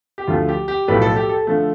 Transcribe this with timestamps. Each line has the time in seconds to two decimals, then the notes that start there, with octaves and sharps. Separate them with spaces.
0.18 G4
0.27 D2 D3 F3 A3 F4
0.49 G4
0.68 G4
0.88 B1 A2 F3 A3 B4
1.02 A4
1.16 G4
1.29 A4
1.47 D3 F3 A3